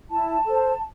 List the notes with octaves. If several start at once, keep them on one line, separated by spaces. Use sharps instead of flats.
E4 A5
A4 C5